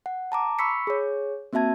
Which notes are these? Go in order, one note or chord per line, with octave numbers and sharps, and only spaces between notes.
F#5
A5 A#5 D6
B5 C#6 E6 B6 C#7
G#4 C#5
A#3 C4 F#4 E5 A5 G#6